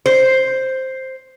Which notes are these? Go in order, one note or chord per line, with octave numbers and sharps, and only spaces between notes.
C5